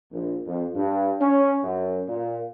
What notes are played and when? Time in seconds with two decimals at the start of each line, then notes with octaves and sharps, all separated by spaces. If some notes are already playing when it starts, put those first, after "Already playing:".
0.11 A#1
0.46 F2
0.75 G2
1.21 C#4
1.64 F#2
2.09 A#2